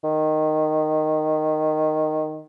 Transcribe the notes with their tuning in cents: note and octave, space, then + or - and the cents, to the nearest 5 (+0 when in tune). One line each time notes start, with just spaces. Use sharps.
D#3 -10